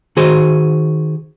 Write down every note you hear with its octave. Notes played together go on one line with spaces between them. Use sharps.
D#3 F#4 G#4 C5